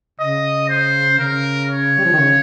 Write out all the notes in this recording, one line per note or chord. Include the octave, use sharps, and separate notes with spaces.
C#3 D#5
C5
C#3 A#4
C#5
G3
F3
D#3
C#3